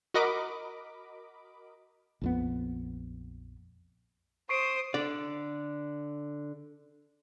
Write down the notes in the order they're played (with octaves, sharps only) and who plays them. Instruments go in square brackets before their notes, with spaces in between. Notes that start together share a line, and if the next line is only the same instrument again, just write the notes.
[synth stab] F#4 A#4 D#5 B5 D6
[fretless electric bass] A#1 F2 B3
[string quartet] C5 D#6 [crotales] C#6 C7 D7
[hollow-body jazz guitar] D3 D5